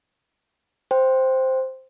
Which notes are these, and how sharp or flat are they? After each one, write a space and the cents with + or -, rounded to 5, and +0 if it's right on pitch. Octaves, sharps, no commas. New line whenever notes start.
C5 +0 G5 +0